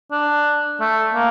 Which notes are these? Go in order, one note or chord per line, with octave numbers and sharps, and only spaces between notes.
D4
A3
A#3